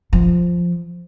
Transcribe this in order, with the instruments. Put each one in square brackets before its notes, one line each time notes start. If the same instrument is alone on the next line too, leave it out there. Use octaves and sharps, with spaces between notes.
[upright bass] F3